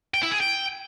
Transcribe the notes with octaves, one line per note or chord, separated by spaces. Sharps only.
G5
E4
G#4
G5